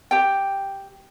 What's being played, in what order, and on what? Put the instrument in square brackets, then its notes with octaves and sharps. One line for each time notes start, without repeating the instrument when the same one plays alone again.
[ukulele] G4 G5